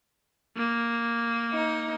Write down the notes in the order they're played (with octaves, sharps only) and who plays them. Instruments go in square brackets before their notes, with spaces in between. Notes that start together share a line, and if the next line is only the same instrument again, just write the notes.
[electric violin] A#3
[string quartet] D#4